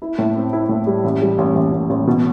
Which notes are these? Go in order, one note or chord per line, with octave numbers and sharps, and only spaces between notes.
E4
A2
C4
E4
A2
G3
A1
G3
A1
A1
A1
A1
B2